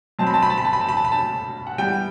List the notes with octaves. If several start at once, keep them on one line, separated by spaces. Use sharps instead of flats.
B2 F#3 C4 A5
B5
A5
B5
A5
B5
A5
B5
A5
B5
A5
B5
A5
F#5
E3 G3 B3 G5